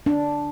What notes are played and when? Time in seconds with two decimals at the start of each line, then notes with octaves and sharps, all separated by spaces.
0.06 D4